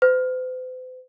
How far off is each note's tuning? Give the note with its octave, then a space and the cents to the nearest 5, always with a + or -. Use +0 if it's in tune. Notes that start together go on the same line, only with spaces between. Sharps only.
C5 -45